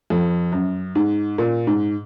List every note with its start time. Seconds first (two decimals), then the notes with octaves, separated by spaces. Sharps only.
0.10 F2
0.52 F#2
0.95 G#2
1.38 A#2
1.67 G#2